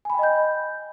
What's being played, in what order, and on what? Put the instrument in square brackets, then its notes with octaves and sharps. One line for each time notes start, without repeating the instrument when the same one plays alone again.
[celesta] G#5
B5
G5
D#5
G6